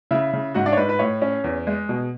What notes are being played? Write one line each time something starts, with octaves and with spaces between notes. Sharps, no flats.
C#3 E4 E5
C#3
G#2 F#4 F#5
D4 D5
C#5
G#2 B4
B4
A2 C#5
C#4
E2
G#3
B2